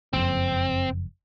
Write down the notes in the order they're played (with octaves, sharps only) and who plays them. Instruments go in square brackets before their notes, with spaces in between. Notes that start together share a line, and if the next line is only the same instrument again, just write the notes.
[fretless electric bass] F#1 F2 [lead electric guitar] C4